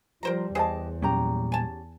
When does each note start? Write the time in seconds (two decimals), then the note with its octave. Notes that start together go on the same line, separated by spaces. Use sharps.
0.23 F3 G3 A#4 C5 A#5
0.55 E2 G4 G#4 C5 D#5 A5
1.02 A#2 F#3 G3 C#4 G4 A#5
1.52 G#5 A5